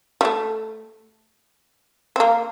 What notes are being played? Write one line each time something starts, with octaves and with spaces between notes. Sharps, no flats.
G3
A3
C4
A#3